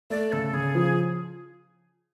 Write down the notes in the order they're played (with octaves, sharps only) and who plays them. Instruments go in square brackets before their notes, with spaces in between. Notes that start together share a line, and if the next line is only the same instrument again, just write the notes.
[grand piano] A3 [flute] D5
[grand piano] C#3 [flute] A4
[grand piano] C#3 [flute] G#4
[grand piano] F3